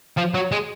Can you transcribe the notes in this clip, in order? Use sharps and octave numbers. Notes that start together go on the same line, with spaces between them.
F3
F#3
G#3